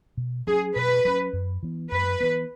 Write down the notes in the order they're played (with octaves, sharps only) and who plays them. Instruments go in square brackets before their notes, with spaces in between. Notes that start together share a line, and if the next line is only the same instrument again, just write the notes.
[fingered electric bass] B2
[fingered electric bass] F#3 C#4 [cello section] G#4
[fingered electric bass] B2 [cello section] B4
[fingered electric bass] F#3 C#4
F#2
E3 B3
[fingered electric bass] F#2 [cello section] B4
[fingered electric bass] E3 B3